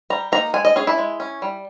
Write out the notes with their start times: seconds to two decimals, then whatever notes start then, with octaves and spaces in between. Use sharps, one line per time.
0.10 G3 A#5
0.32 A#3 D#4 A#5
0.54 G#3 G#5
0.65 D#5
0.76 C#4 G#4
0.87 E4
0.98 G#3
1.20 C#4
1.42 G3